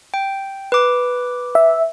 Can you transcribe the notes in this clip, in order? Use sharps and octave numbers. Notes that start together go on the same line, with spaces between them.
G5
B4 D6
E5